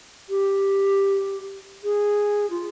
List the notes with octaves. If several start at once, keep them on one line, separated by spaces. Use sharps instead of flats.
G4
G#4
F4